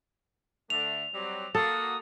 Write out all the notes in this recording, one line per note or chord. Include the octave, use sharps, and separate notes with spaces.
D3 A3 D4 F7
F#3 G3 C4
A#3 F#4 A4 D#6